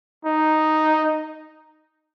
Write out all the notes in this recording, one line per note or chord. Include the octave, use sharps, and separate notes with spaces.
D#4